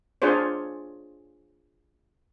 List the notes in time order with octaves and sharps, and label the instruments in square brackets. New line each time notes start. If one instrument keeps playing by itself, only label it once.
[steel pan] D4 F4 G#4 C5 C#5